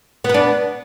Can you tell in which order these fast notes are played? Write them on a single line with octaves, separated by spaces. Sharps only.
B3 B4 D4